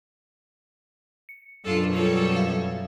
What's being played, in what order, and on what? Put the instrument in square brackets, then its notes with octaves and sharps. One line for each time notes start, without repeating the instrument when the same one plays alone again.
[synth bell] C#7
[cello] F#2 B2 [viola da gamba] D4 F4 A4
[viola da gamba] G3 A4 C#5 [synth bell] F4 C#7
[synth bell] E5 F5